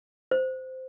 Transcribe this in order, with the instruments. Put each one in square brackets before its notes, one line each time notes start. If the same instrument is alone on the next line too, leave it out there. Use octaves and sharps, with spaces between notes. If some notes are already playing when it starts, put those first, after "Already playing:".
[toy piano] C5